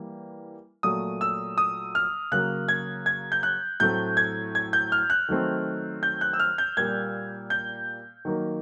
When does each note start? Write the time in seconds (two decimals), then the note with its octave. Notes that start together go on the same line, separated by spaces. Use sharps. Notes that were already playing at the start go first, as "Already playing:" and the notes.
Already playing: E3 G3 A#3
0.83 A#2 F#3 A3 D#6
1.21 E6
1.58 D#6
1.95 F6
2.32 C#3 F#3 A#3 F#6
2.68 G#6
3.06 G#6
3.32 G6
3.43 F#6
3.80 A2 F#3 A3 C4 G6
4.17 G#6
4.55 G#6
4.73 G6
4.92 F6
5.10 F#6
5.29 D#3 F#3 A3 C4
6.03 G6
6.21 F#6
6.33 E6
6.40 F6
6.58 G6
6.77 A#2 G3 A#3 G#6
7.50 G6
8.25 D#3 F#3 A#3